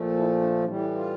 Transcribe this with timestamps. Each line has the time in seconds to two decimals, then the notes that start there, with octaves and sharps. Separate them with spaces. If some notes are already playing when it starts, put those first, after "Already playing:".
Already playing: A#2 F3 A3
0.18 E4
0.41 D4
0.64 A2 E3 G3 D4
0.80 E4
0.95 F4